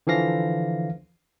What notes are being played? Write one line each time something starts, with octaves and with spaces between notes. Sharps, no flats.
D3 E3 F3 F5 A#6